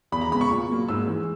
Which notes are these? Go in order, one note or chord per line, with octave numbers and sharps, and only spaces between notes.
E2 B5
A#5
C#3 G#3 B3 B5
C#6
A#2
F#3 A#3
G#2 E6
E3 G#3